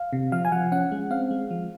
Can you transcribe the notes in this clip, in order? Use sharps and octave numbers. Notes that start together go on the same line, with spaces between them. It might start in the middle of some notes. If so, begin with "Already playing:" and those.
Already playing: F5
C3
F3 F5
G#5
F3 F#5
C#4 F#5
G#3
C4 F5
G#3
F3